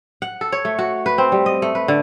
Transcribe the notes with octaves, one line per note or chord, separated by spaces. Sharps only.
F#5
A4
C#5
A3
F#4
B4
C4
G3
D#5
A3
B4
D3